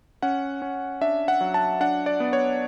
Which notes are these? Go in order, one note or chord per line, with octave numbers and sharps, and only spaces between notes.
C#4 F#5
C#4
D4 E5
F#5
F#3
A5
D4 F#5
D5
B3
C#5